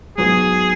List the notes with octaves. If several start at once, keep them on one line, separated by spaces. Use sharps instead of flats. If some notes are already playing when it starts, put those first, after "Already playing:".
G#2 F#3 B3 F#4 G#4